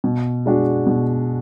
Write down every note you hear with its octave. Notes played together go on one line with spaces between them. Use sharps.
B2
G#3 D4 F#4
B2